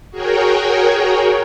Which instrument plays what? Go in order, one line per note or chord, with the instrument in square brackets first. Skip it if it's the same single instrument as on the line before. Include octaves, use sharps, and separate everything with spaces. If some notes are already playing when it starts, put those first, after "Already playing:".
[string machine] F#4 G#4 A#4 C#5 G5